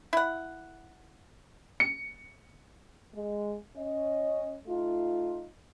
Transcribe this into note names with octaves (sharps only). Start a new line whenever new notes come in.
E4 F#5
C#7
G#3
C#4 D#5
A3 D#4 F4